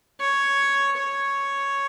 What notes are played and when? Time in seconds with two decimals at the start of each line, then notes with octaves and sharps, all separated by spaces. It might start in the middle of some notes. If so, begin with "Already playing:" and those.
0.20 C#5
0.97 C#5